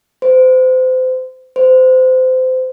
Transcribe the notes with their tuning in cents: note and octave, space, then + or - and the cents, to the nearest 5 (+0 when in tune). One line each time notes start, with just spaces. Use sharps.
C5 -30
C5 -25